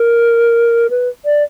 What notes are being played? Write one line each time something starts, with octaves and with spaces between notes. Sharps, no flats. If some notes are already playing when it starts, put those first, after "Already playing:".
Already playing: A#4
B4
D5